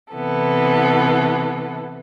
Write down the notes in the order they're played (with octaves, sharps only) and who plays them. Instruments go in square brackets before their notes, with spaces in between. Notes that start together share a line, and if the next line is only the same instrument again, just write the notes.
[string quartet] C3 E3 B3 A4